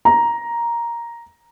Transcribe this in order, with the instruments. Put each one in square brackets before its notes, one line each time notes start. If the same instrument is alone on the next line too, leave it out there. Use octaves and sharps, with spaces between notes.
[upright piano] A#5